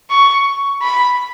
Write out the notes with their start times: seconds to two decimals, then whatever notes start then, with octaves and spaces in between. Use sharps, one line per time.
0.10 C#6
0.82 B5